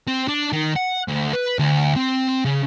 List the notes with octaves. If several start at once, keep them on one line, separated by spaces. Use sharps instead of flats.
C4
D4
D#3
F#5
D2
B4
D2
C4
C#3